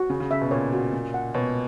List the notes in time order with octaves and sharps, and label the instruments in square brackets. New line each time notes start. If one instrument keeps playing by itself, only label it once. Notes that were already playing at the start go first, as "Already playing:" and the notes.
Already playing: [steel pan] F#4
[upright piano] C#3 [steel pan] C#4
[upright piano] C#3
[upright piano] C#3 [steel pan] E5
[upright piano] B2
[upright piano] A#2 [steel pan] C#5
[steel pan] F#4
C#4
F#5
[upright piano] B2 [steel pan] C#5